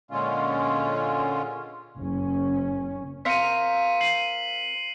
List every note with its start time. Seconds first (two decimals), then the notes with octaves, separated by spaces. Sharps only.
0.11 A#2 D3 G#3 C#4 F4
1.98 F#1 C#4
3.25 C4 A#4 F5 B6 C#7 D#7
4.01 C7 D#7 F#7